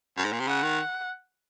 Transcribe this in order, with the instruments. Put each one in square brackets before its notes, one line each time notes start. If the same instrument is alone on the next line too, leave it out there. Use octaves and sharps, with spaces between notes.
[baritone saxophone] F#2
G#2
A#2
C3
[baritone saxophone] C#3 [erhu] F#5
[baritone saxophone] D#3